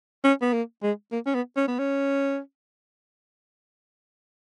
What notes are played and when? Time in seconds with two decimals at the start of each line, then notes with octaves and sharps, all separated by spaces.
0.24 C#4
0.42 B3
0.53 A#3
0.83 G#3
1.12 A#3
1.26 C#4
1.35 B3
1.57 C#4
1.68 B3
1.79 C#4